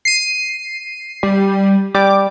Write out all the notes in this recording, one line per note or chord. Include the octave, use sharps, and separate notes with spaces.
C7 D#7
G3
G3 D6